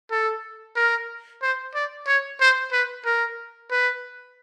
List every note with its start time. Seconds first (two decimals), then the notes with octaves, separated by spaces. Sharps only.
0.11 A4
0.76 A#4
1.42 C5
1.75 D5
2.07 C#5
2.41 C5
2.72 B4
3.05 A#4
3.71 B4